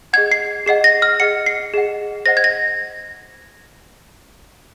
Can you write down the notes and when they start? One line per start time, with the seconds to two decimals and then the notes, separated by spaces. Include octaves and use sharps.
0.13 F#5 G#6
0.16 G#4 D#5
0.31 C7
0.66 G#4 D#5 F#5 C7
0.84 A#6
1.02 F6
1.20 G#4 D#5 F#5 C#7
1.46 C7
1.74 G#4 D#5 F#5
2.26 C5 D#5 F#5 A#6
2.37 G#6
2.44 A#6